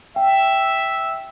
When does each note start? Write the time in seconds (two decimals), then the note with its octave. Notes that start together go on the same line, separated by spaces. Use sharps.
0.16 E5 G5